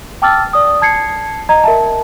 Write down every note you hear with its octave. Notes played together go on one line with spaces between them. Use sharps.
G5 A5 D6 E6 F6 A6
D5 D#6
A5 G#6 C7 C#7
D#5 A#5 G#6
A#4 E5 A5